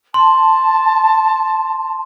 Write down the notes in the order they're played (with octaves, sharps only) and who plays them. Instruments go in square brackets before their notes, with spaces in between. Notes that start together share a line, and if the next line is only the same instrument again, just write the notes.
[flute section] A5 [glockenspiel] C6